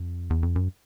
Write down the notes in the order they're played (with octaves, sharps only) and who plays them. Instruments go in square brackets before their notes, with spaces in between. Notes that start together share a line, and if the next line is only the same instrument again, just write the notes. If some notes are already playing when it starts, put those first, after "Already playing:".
Already playing: [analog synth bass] F2
E2
F2
F#2